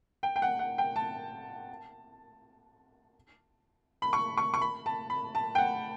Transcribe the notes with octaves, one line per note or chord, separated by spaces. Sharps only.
G5
G5
F#5
F#5
G5
A5
B5
C#6
C#6
C#6
B5
A5
B5
A5
G5
F#5